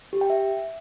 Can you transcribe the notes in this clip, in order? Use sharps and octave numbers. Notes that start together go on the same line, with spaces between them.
G4
G5
E5